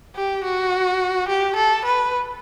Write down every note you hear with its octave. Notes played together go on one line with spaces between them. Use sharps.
G4
F#4
G4
A4
B4